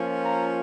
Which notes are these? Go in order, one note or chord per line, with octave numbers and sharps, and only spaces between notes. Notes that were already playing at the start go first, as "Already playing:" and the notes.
Already playing: F3 A#3 C#4 F4
A#5